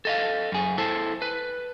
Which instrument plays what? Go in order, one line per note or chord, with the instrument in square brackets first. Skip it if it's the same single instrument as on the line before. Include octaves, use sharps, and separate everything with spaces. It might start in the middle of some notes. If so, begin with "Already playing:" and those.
[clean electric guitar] A4 D#5 F5
F#2 G#4
E4 A4 C5 A5
B4